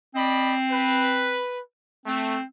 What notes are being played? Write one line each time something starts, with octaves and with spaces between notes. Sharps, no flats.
C4 D5 D#5 B5
B4
A3 C4